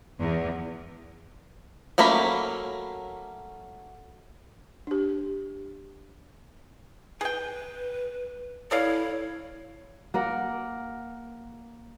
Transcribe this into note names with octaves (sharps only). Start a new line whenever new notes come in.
E2
F#3 A3 A#3 C#4 B5
D4 G4
G#4 B4 G5
E4 A4 C#5 D5 F5
A#3 A#4 F#5